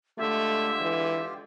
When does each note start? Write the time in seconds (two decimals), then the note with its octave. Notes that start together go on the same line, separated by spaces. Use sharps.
0.18 D3 G#3 A3 F4 G4 E5
0.81 E3